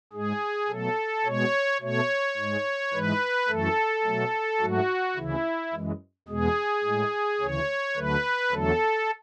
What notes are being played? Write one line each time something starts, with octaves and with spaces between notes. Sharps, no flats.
G#2 G#3 G#4
B2 F#3 A3 A4
B2 G#3 C#5
B2 A3 C#5
G#2 G#3
G#2 E3 G#3 B4
F#2 E3 A3 A4
B2 F#3 A3
G#2 F#3 A3 F#4
D2 C#3 E3 E4
F#2 E3 G#3
E2 B2 G#3 G#4
A2 G#3
D2 C#3 E3 C#5
D2 D3 F#3 A3 B4
E2 D3 F#3 A3 A4